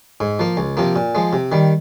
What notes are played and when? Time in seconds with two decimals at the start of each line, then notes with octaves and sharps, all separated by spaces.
0.20 G#2
0.39 F3 A#3
0.57 C#2
0.77 C3 F3 A#3
0.96 A#2
1.15 F3 G#3
1.33 C3
1.52 D#3 G3